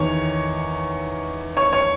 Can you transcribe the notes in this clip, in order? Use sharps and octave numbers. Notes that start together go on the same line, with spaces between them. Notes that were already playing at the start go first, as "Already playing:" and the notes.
Already playing: E2 D#3 C#5 C#6
C#5 C#6
C#5 C#6